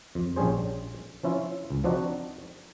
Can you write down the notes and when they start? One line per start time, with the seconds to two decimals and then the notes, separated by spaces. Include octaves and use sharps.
0.15 F2
0.36 A#1 G3 C#4 G#4 C5
1.23 F3 C#4 E4 F4
1.70 C#2
1.84 F3 C4 D4 D#4 F#4